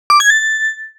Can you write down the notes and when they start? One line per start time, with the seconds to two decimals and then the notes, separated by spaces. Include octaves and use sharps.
0.10 D6
0.20 G#6
0.30 A6